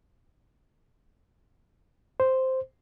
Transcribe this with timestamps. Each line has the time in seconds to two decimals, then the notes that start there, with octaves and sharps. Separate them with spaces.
2.20 C5